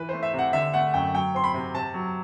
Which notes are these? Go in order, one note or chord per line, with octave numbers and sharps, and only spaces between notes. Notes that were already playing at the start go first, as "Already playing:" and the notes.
Already playing: E3 B4
A3 C5
E5
C3
F#5
D3 E5
A3 F#5
F#2 G5
F#3 G5
C4 C6
B5
C3
C3 A5
F#3